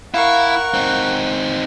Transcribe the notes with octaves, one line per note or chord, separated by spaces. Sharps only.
E4 A#4 F5 F#5 C#6
C4 D#4